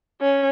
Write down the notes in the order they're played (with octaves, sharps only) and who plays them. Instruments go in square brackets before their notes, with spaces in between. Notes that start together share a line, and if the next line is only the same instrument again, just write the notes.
[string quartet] C#4